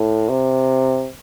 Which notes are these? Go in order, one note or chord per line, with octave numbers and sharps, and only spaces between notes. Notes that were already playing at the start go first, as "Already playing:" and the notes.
Already playing: A2
C3